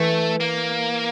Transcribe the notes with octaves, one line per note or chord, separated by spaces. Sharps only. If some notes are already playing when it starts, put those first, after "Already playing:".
Already playing: E3 A3
A#3